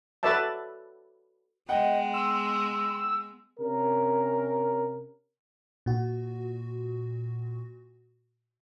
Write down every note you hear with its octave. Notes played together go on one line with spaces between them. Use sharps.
F#4 A4 B4 D5 E5 A5
G#3 B3 D#5 F#5 G5
C6 E6
C3 C#4 A#4
A#2 F#4